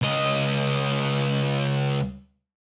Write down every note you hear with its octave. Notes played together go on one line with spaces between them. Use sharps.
C#2 D#5